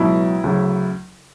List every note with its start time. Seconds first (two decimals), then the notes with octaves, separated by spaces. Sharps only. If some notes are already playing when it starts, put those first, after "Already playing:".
Already playing: C#2 B2 F#3 E4
0.44 D2 C#3 F#3